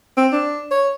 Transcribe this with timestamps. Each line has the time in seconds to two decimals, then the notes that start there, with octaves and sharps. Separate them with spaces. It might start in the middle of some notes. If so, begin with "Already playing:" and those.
0.17 C4
0.33 D4
0.71 C#5